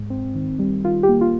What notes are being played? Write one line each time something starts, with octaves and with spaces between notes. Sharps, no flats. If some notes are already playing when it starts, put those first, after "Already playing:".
Already playing: G#2
C4
D#3
G3
D#3 F4
G4
A#3
F4